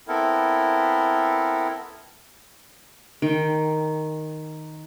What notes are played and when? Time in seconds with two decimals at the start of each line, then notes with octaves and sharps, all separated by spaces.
0.08 B3 C4 E4 A4 A#4
3.22 D#3 G5